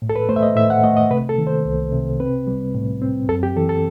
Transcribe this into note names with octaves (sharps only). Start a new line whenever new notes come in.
A2
A4
B4
A3 C5
E5
D#5
A2 E5
F#5
A3 D#5
D#5
C3 B4
A4
D#3
C5
C2
C3
C4 B4
G3
A2
C4
F#2 A4
G4
E3 A4
A4